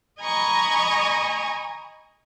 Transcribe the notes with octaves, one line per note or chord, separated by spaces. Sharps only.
D#5 G#5 A#5 B5 C#6